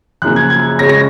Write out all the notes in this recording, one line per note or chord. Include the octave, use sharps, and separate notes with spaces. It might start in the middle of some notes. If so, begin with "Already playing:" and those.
F#2 C#3 F3 A#3 F#6
G#6
G#6
C#3 G#3 C#4 A#6
A#6